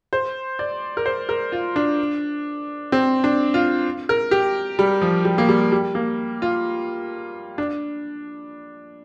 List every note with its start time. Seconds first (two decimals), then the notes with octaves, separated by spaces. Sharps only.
0.13 C5
0.59 D5
0.97 A#4
1.06 C5
1.29 A#4
1.52 F4
1.76 D4
2.92 C4
3.24 D4
3.54 F4
4.09 A#4
4.31 G4
4.79 G3
5.02 F3
5.25 G3
5.38 A#3
5.49 G3
5.72 G3
5.95 A#3
6.42 F4
7.58 D4